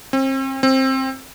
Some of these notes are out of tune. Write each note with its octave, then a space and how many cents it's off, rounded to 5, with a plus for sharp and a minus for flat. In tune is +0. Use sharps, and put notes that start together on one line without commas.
C4 +35
C4 +15